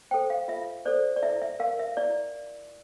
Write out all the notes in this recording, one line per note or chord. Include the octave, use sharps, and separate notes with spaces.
A4 C5 G5
F5
F4 E5
A4 C5 D5
D5
E4 E5
E5
A#4 F5
E5
E4 D5